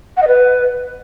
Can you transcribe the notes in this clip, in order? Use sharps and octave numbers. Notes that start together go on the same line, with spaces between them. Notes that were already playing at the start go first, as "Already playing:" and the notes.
F#5
D#5
B4